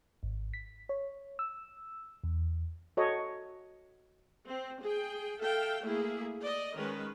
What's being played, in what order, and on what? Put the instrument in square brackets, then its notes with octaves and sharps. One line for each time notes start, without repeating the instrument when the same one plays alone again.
[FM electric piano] G#1
B6
C#5
E6
E2
[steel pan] F#4 A4 C#5 D#5
[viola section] C4
G#4 G5
A4 E5 F5 G5
A3 A#3 E4 G#4
D5 D#5
D#3 G#3 C#4 A#4 B4